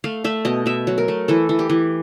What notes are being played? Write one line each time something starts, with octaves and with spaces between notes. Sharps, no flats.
A3 F5
A3 E5
B2 D#5
B2 E5
F#3
A#4
A3
E3 A4
E3
G4
E3